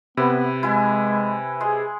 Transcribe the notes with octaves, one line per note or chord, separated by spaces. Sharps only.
C3 B3 E4 B4
G#3 E4 G#5
G#3 G#4